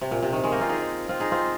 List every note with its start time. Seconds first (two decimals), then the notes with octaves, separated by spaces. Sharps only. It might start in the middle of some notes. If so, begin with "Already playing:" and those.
0.01 C3
0.11 A#2
0.23 C3
0.33 D#3
0.44 D#3 G#3
0.52 A#3 D#4
0.60 C4 F4
0.69 D#4 G#4
1.09 C4 F4
1.20 D#4 G#4
1.32 C4 F4